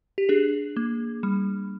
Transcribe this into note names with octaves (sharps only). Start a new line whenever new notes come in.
G4
D4 G#4
A#3
G3